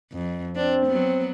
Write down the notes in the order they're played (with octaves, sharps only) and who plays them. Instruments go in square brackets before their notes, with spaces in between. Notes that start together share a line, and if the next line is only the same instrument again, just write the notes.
[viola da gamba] F2
[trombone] C4 [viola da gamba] D4
[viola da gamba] F#3 B3